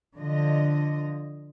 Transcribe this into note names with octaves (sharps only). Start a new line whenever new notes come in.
D3 F3 D#5